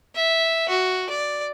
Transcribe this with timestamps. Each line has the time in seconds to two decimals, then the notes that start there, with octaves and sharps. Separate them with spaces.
0.15 E5
0.69 F#4
1.10 D5